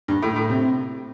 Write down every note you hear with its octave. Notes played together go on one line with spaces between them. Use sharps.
G2
A2
A2
C3